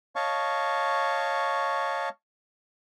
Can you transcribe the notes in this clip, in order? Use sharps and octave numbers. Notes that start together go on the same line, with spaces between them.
C#5 D#5 F5 A5 C#6